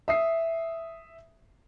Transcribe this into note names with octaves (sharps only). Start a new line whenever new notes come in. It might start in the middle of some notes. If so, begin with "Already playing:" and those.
E5 D#6 C7